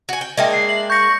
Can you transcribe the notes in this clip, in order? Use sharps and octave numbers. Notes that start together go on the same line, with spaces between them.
F#4 G#5
G5
G#3 A#3 D4 D#5 E5 G5
C7
F#7
C#6 G6 A#6